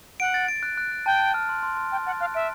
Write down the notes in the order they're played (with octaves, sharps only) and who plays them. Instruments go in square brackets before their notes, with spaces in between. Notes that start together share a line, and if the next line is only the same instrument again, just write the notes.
[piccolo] F#5 [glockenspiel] D7
[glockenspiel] A6
D7
F#6
F#6
F#6
[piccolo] G5 [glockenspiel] A5
[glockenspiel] A5
F6
C6
C6
C6
[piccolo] G5 [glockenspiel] F#6
[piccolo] F#5 [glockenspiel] A6
[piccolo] F5 [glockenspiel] F#6
[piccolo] E5 [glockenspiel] D7